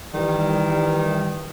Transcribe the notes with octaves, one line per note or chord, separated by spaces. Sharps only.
D#3 E3 G3